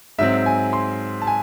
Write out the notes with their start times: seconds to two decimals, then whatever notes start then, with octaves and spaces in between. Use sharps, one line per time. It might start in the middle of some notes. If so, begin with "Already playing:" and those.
0.18 G#2 F#3 C4 E5
0.46 G#5
0.73 C6
1.22 A5
1.27 G#5